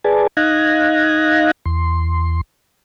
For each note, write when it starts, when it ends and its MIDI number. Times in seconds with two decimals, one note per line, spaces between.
0.04 0.27 68
0.04 0.27 71
0.04 0.27 74
0.04 0.27 80
0.04 0.27 81
0.37 1.51 63
0.37 1.51 75
0.37 1.51 77
0.37 1.51 90
0.37 1.51 92
0.37 1.51 94
1.66 2.41 40
1.66 2.41 84